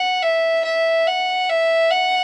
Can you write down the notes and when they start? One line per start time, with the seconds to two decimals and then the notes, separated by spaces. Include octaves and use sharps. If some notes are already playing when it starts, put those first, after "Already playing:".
Already playing: F#5
0.22 E5
0.65 E5
1.07 F#5
1.49 E5
1.91 F#5